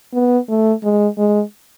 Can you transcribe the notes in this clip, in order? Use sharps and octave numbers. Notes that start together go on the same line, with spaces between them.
B3
A3
G#3
G#3